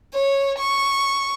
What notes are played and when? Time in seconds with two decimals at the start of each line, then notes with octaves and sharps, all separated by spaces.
0.14 C#5
0.58 C#6